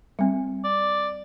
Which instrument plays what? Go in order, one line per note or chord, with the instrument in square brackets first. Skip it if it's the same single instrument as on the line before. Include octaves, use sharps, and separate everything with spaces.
[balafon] G3 C4
[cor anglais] D5